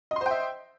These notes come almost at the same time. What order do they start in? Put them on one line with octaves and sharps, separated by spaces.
D#5 C6 C5 G5 E5